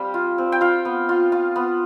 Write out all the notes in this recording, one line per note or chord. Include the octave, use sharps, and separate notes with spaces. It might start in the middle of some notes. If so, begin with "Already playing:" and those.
Already playing: G3 C4 F5 G5
F4
C4
G5
F4 F5
B3
F4
F4
B3